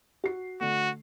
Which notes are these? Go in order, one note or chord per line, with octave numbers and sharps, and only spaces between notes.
F#4 C7
D3 A3 F#4